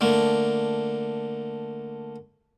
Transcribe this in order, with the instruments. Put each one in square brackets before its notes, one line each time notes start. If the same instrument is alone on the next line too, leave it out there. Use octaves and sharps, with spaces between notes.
[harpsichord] D3 A3 A#3